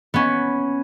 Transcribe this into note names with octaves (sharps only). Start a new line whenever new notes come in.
B3 C#4